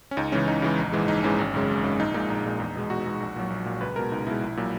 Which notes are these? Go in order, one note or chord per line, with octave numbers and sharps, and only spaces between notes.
C#4
C#2 D#4
C#3 E3 G#3 C#4
C#2 D#4
C#3 E3 G#3
A#1
G#2 E3 G#3
A#1 D#4
G#2 E3 G#3 C#4
G#1
F#2 C#3 G#3
G#1
F#2 C#3 G#3
A#1 D#4
A#2 G#3 D#4
A#1 D#4
A#2 G#3
E2
B2 G#3
E2 F#4
B2 G#3
A#1
A#2 F#3
A#1
A#2 F#3
C#2 B4
B2 G#3 A#4
C#2 D#4
B2 G#3 E4
A#1
A#2 F#3